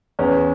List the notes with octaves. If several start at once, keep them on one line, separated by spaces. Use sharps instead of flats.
E2 C#4